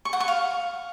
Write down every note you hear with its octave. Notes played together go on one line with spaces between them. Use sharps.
C#6
F#5
C#6
F5